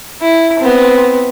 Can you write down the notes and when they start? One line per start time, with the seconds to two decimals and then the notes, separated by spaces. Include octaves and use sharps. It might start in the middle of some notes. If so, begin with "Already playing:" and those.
0.22 E4
0.59 B3 C4